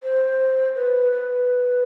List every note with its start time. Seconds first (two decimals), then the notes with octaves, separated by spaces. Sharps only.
0.03 C5
0.75 B4
1.12 B4